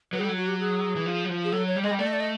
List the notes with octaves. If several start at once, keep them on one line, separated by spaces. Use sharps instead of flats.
F#3 B4
G3 G#4
A4
F#3
F#4
G4
G#4
E3
F3
F#3
F3
G#4
F#3 A4
C#5
G3
G#3 D#5
G3
A3 D5
D#5
D5
D#5